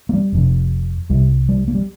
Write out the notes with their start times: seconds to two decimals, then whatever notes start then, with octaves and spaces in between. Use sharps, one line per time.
0.09 A#3
0.14 G3
0.32 F1 F2 C3
1.10 C2 C3 G3
1.49 G3
1.68 A#3
1.75 G3